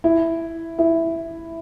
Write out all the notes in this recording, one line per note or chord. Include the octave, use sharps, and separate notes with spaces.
E4
E4